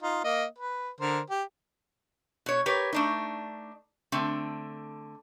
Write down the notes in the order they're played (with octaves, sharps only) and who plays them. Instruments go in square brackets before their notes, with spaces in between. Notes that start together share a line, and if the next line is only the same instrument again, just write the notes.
[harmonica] D#4 F4
A#3 D#5
B4
D3 A#4 C5
G4
[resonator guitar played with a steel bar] B2 C#5
G4 A#4 B4 C#5
A3 D4 D#4
D3 A3 C4